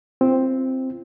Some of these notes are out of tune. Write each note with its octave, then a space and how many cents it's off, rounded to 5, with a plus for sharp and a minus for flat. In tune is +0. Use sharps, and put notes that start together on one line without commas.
C4 +0 F4 -35